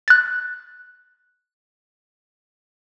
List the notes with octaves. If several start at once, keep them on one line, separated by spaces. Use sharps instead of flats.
F#6 A6